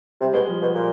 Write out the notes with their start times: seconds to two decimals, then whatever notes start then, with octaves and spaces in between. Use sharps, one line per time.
0.21 C3 G3
0.34 B2 G#3
0.47 F3 G3
0.62 B2
0.75 A#2